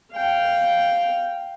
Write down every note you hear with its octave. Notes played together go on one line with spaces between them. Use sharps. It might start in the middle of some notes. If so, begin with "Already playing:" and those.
F5 G5